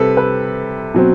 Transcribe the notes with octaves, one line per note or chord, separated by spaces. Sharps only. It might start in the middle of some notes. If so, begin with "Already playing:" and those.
Already playing: C3 G3 C4 A4 B4
B4
B2 F#3 C4